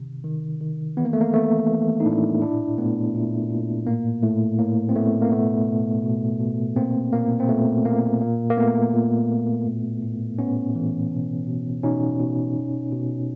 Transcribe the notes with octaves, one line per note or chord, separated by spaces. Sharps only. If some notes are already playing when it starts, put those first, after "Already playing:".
Already playing: C3 D#3
D#3
D#3
E3 B3
A#3
A3
A#3
E3 A3 B3
E3
D#4
A2 D4 E4
A#2 D4 E4
A#2 A3 B3
A#2
A#2
A2 A#3
A2 A3
A2 A#3
C4
A2 A3 B3
A#3
B2 A3 B3
B2
B2
B2
A#2 A#3 C4
A#2 A#3
C4
A#2 A3 B3
A#2 A#3
A#2 A#3
A#3
A#2 A3 B3
A#2
A#2
A2
A2
A2 B3 C#4
E3
B2
B2
B2 C#4 D#4
B2
B2
B2